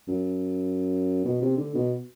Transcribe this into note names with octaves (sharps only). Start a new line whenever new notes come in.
F#2
B2
C3
D3
B2